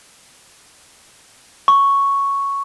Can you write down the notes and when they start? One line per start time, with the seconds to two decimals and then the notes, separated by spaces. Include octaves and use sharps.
1.68 C#6